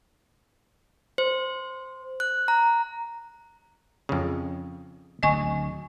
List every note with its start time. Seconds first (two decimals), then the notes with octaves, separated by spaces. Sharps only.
1.18 C5
2.20 F#6
2.48 A#5
4.09 F2 C#3
5.23 D1 D2 D#5 G#5 C#6